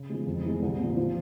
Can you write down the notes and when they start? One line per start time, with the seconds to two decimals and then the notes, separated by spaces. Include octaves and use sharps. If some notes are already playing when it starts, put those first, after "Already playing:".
Already playing: C#3
0.09 F3 G#3
0.27 F2
0.44 E3 G#3
0.62 C2
0.79 A#2 F3
0.97 F3